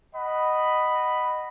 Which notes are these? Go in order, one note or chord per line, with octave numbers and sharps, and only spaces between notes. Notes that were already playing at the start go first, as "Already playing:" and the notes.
D#5 F#5 B5